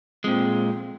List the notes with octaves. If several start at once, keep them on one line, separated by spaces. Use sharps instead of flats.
F2 A#2 G#3 C4